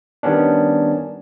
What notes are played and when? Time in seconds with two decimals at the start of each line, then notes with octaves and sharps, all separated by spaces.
0.23 D#3 G3 B3 C#4 D4